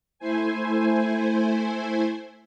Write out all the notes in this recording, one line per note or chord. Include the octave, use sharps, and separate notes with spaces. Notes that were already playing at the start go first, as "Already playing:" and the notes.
A3 E4 C5 G#5